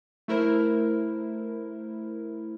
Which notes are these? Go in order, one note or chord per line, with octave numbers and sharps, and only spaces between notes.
A3 E4 A#4 C5